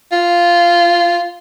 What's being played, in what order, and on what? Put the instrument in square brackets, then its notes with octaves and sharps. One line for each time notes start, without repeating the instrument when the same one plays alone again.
[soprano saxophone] F4